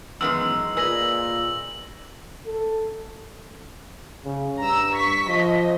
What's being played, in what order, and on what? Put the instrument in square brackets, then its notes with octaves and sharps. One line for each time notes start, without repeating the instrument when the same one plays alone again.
[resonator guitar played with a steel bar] F#2 D#3 G#3 [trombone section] E3 B3 [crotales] E6
[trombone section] A#2 [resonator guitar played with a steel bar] G#4 B4 D#5 [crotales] E6 A#6 F#7
[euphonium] A4
[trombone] C#3
[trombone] G2 [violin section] A#5 E6
[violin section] C#6 B6
[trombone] F3 [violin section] D#5